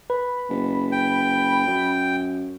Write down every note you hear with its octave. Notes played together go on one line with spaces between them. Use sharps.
B4 B5
F#1
G5
F#2